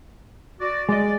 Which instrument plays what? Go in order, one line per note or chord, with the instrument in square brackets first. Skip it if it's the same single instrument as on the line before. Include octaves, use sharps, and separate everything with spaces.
[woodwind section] F#4 D5
[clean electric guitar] G#3 D#5 [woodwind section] D5